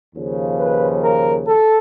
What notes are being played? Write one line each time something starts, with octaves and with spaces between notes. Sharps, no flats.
D#2 C#3 F3
B4
A#4
A4